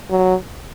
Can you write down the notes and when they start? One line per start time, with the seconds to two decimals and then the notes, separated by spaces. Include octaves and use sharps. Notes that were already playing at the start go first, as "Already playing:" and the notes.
0.10 F#3